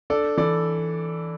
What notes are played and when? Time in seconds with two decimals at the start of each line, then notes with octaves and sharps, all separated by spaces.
0.10 D4 A4 D5
0.37 E3 A4 D5